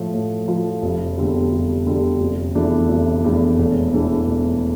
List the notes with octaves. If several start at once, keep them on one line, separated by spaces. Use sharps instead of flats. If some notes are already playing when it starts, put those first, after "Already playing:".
Already playing: A2 F3 A3
A2
F3 A3
F1
E2 D3 G3
F1
E2 D3 G3
F1
E2 E3 A3 D4
F1
E2 E3 A3 D4
E1
E2 E3 A3 D4
E1